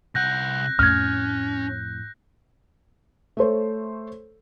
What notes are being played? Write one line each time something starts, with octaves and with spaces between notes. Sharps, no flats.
C2 F#5 F#6 G6 A#6
F2 A2 C#4 F6 G#6
A3 A4 C5 C#5